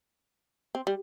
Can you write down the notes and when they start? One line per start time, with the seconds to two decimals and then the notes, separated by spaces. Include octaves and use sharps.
0.75 C4
0.87 G3